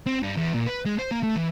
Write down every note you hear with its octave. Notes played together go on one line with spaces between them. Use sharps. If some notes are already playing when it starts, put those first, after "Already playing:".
C4
G2
E2
A#2
B4
G#3
C5
A#3
A3
E3